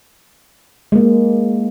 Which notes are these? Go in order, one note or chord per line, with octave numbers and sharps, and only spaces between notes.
G#3 A#3